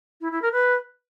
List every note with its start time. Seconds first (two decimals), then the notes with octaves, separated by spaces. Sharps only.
0.20 E4
0.31 E4
0.41 A#4
0.52 B4